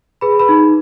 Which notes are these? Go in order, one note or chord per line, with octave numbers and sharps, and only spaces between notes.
G#4 B4 B5
B4 B5
D#4